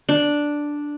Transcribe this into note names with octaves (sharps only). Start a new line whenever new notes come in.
D4